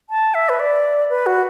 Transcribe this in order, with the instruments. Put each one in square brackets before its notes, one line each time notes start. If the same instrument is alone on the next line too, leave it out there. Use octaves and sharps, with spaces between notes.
[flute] A5
E5
B4
D5
B4
F#4